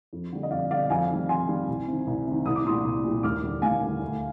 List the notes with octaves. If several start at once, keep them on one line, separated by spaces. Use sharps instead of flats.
F2
D3 G3
D#5
F2 D5 F5
D3 G3 D5 F5
F2 F5 G#5
D#3 G3
F2 G#5 C6
D#3 G3
C2
C3 D#3
C2
C3 D#3
C2 D#6
D6
A#2 G3 C6 D#6
C2
A#2 G3
D#2 D6 F6
D3 G3
D#2 F5 G#5
D3 G3
D2